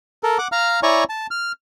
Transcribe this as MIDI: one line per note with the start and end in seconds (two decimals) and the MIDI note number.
0.23 0.38 69
0.23 0.38 70
0.38 0.48 78
0.38 0.48 86
0.52 0.80 77
0.52 0.80 82
0.52 0.80 89
0.83 1.04 64
0.83 1.04 73
0.83 1.04 74
0.83 1.04 80
0.83 1.04 82
0.83 1.04 85
1.09 1.27 81
1.31 1.52 89